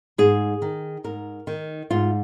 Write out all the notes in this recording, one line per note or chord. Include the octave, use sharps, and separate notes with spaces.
G#2 G#4
D#3
G#2 A#4
D#3
G#2 F4